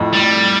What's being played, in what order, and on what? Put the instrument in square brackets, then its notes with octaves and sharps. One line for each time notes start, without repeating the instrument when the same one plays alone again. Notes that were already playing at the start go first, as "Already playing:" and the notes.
Already playing: [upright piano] F2 A2
[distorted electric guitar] G3